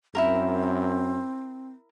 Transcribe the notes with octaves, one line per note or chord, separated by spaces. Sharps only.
F#2 C4 E4 F4 A#4